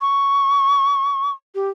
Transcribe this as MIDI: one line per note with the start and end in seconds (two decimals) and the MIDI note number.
0.01 1.31 85
1.55 1.69 67